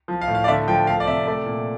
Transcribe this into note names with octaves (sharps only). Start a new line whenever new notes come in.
F3
F5
A2
F5
D5
D3 E5
F3 G5
A3 F5
D5
C3 E5
A3 D5
A#2